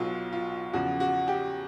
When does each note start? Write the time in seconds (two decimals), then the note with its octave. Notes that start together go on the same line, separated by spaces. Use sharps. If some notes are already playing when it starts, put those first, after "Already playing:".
Already playing: B1 B2 F#3 F4
0.33 F4
0.73 E2 C#3 F3 F#4
1.00 F#4
1.28 G4